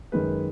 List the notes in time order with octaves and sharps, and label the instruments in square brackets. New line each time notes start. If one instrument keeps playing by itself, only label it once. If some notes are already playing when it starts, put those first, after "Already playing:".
[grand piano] F#2 D#3 G#3 B4